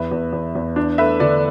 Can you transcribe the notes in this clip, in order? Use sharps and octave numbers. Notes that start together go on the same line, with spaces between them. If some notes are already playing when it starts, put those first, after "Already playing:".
Already playing: E2 B4 E5
E2
E2
E2
D4
A3 B4 E5
D3 A4 D5